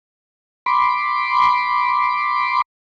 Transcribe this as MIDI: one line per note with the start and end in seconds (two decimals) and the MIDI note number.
0.66 2.62 83
0.66 2.62 84
0.66 2.62 86